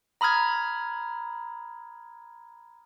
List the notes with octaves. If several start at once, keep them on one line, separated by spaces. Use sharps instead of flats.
A#5 B5 D#6 F6 G#6